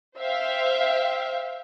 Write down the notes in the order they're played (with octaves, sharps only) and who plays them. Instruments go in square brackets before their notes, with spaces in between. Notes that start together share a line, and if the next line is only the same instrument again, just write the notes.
[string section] C5 E5 F5 G5